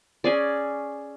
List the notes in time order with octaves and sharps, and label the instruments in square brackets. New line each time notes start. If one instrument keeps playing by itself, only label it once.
[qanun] C#4 G#4 D5